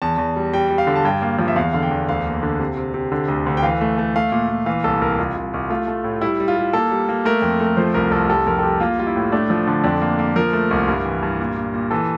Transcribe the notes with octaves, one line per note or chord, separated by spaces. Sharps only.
E2 A5
E2
G3
G3 G5
G3
F5
D3
A5
G2 G5
A#3
F3
E5
E2 F5
D3 F5
G5
E2
D2 F5
A#3
D3
C3
C3
C3
D3
D2
D2
G5
E3 F5
A3
A3
A3 F5
A#2
A#2
E3 F5
C2 A4
C2 A#4
C2 F4
C2
C2
A3 F4
A3
A2
G3 E4
G3
F4
G3
A#3 A4
G3
A#3
A3 A#4
F2
A3
A#4
F3 C5
C2 A#4
C2 A4
G3 A4
F2 A#4
A4
G3 G4
A#3 F4
G3 F4
E4
A2
A3 D4
F3
D3
F2 D4
A#3
A#3
F3 A#4
A3
C2
G2
E3
G2
A#2
A#2
A#2
E3 A4